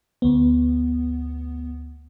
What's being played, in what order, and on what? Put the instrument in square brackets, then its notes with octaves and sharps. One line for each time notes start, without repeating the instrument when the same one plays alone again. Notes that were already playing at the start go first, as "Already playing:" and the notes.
[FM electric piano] D2 B3